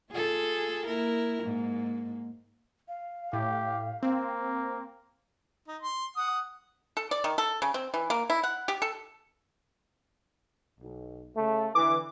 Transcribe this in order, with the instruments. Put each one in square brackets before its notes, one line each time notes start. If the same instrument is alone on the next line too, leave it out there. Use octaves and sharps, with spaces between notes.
[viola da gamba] F4 G#4 A4
A#3 E4 A#4
G#2 A#3
[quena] F5
[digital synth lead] A2 [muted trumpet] G4
[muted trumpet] A#3 [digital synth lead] C4
[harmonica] D#4
C6
F#5 D#6
[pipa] A4
D5
D#3
A4
C#3
C4
E3
A#3
E4
F#5
G4
A4
[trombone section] B1
C#3 A3
[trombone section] D3 E3 [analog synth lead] D6